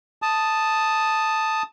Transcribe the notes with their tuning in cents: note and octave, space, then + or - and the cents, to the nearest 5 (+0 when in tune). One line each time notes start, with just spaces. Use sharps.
A5 +0 D#6 +0